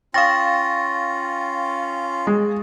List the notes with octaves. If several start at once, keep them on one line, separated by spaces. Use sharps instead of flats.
C#4 F4 F5 G5 C#6 A6 A#6
G#3